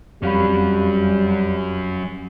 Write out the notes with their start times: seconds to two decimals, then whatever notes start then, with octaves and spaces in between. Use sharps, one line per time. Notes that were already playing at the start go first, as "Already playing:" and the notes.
0.23 F2 F#3 G3 C#4 F5 B5